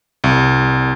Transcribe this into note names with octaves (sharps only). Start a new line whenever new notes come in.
C2